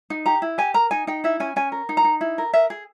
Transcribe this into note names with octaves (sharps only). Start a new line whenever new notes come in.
D#4
G4 A#5
E4
G4 G#5
A#4 A#5
D#4 G#5
D#4 G5
E4 E5
C#4 G#5
C#4 G#5
A#4
D#4
A#5
D#4
E4
A#4
A#4 E5
G#4